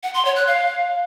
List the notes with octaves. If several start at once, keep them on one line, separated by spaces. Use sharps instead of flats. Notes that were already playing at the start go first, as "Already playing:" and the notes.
F#5
C6
C#5
F#6
F5